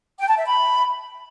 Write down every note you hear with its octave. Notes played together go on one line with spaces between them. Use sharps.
G5
A5
E5
B5